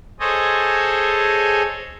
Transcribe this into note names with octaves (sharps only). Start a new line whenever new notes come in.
G#4 A4 C5 C#5 D#5